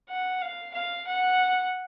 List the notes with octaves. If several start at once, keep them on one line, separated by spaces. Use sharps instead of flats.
F#5
F5
F5
F#5